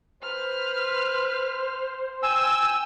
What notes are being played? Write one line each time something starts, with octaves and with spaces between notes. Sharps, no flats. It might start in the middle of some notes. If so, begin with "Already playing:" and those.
B4 C5 F6
G5 G#5 E6